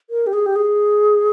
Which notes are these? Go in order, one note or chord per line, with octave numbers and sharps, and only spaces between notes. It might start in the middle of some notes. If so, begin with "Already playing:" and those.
A#4
G4
G#4
G4
G#4